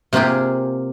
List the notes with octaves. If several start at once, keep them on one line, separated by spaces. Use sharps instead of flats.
C3 A#3 F4 G4 G#4